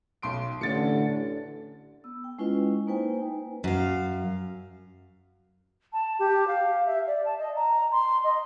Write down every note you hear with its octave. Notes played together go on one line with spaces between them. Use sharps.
B1 C6 D7
A1 D3 C#4 A6 C#7
B3 E6
G5
G#3 C#4 E4 F4 B4 D#5
A#3 D#4 B4 C5 G5 G#5
F#2 F5
A5
G4
F5
E5
D5
A5
D#5
A#5
C6
D#5